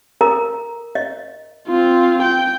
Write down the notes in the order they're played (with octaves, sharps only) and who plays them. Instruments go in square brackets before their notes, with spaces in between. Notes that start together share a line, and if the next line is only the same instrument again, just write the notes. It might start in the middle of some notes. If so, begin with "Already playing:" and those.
[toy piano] A4 A#4 A#5
D#5
[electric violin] C4 F4
G5